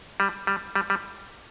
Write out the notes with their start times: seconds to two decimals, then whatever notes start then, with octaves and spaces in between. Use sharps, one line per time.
0.20 G3
0.47 G3
0.76 G3
0.90 G3